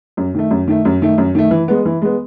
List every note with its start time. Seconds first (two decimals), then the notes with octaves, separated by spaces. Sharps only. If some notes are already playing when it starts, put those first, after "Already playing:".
0.17 F#2
0.34 D#3 A3
0.51 F#2
0.68 D#3 A3
0.85 F#2
1.02 D#3 A3
1.18 F#2
1.35 D#3 A3
1.51 E3
1.68 G#3 B3
1.85 E3
2.02 G#3 B3